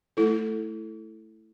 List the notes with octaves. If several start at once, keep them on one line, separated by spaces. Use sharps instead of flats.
A3 E4 A4